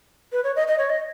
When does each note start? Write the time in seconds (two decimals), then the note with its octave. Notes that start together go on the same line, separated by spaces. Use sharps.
0.32 B4
0.44 C#5
0.56 D#5
0.67 D#5
0.78 C#5
0.90 D#5